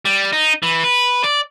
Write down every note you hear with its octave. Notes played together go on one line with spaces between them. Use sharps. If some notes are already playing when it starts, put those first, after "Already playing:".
G3
D#4
E3
B4
D5